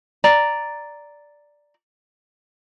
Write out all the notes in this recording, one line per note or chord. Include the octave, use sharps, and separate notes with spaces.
D5 A#5